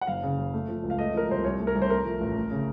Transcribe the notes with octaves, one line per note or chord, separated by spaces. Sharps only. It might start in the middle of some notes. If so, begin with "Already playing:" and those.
F#5
F#1 F5
C#3
F#1
A3
F3
C#2
F5
A3 D#5
F3 A#4
C2 C5
C2 C#5
A3
A#4
C2
C5
A3 A#4
F3
A1
A3
C#3